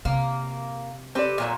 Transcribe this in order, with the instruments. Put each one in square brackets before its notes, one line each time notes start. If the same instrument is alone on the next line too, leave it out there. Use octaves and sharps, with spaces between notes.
[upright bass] C3 [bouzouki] A#3
[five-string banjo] C4 D5 [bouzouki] G4 A4 B4
[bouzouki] A#2 F#3 A3